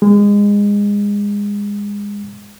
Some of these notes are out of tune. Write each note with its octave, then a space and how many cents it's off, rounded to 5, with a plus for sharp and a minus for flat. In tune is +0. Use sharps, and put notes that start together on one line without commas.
G#3 -25